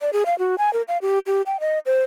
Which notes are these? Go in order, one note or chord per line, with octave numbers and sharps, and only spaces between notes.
D5
G#4
F5
F#4
G#5
A#4
F5
G4
G4
G5
D#5
C5